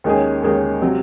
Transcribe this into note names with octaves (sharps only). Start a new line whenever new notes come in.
D#2 D#3 G#3 C#4 G#4
D#2 D#3 G#3 C#4 G#4
C3 F#3 C4